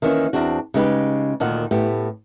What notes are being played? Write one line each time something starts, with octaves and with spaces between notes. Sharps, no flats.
D#3 E3 A#3 C#4
E2 C4 D4 F#4
C#3 G#3 D#4 G4 B4
D2 A#2 D#3 F#5
A2 B3 G4